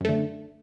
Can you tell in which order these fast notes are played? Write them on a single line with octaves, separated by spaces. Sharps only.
F#2 A3 D3